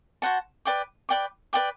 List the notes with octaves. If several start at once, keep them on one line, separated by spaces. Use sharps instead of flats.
F#4 C5 F#5 A5
B4 D5 G5 D6
B4 D5 G5 D6
B4 D5 G5 D6